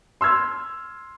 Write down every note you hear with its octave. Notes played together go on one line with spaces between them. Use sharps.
C6 E6 F6 G#6